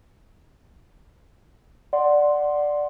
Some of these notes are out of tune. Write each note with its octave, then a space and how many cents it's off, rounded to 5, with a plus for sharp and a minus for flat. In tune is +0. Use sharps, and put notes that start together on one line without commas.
D5 +0 F#5 +0 C6 +0